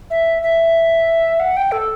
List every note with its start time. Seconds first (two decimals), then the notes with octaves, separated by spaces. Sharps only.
0.10 E5
0.42 E5
1.40 F#5
1.57 G5
1.72 A4